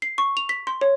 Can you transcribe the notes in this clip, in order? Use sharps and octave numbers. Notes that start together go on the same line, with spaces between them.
C7
C#6
F7
B6
C6
C#5